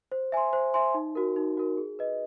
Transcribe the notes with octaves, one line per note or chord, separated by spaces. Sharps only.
C5
E5 G#5 C6
C5
E5 G#5 C6
D#4
F#4 A#4
D#4
F#4 A#4
G#4
B4 D#5